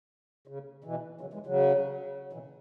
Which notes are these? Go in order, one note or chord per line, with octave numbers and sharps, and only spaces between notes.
C#3
B2 E3
C#3 F#3
E3 G#3
C#3 F#3
B2 E3